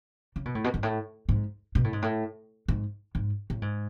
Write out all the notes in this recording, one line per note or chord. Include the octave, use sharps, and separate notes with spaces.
C#3
B2
A2
B2
G#2
A2
G#2
B2
A2
G#2
A2
G#2
G#2
A2
G#2